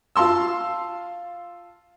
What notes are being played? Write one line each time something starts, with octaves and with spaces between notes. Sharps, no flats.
F4 F5 A5 C6 E6